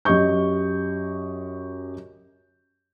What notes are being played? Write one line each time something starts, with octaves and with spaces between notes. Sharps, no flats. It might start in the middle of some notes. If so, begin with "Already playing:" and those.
F#2 G4 D#5 C#6 G6